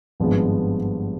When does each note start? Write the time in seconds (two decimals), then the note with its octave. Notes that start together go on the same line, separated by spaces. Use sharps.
0.20 G#1 G2 F3 G#3 B3